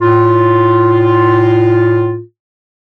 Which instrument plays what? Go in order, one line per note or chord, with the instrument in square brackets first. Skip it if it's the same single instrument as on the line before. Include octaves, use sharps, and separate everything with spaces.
[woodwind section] A2 F4